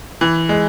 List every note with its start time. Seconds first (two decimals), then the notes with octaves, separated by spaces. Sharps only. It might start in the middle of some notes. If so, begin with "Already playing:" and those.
0.21 E3
0.49 G#3